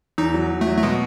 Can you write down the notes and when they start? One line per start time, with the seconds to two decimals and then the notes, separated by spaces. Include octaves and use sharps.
0.18 E2 D#4
0.34 F#3
0.50 E2
0.61 A3
0.67 F#3
0.78 A3
0.83 B2 G#3